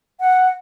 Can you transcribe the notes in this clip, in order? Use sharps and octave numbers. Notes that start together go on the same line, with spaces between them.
F#5